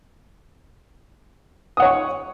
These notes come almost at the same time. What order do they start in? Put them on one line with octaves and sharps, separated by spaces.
D#6 F#5 C#5 C#6